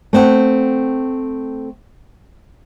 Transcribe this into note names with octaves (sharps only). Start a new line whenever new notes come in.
A3 C4 F#5